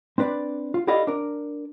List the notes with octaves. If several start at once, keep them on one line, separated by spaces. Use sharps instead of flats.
C4 D4 B4 D5
F4
E4 G4 A4 D5 D#5 F5
D4 A#4